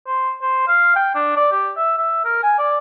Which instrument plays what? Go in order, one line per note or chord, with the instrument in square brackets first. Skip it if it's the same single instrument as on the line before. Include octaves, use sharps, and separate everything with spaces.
[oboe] C5
C5
F5
G5
D4
D5
G4
E5
E5
A#4
G#5
D5